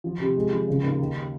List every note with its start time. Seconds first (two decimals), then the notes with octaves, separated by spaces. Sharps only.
0.04 F3
0.20 C3
0.36 G#3
0.52 F3
0.67 C#3
0.83 D#2
0.99 D#3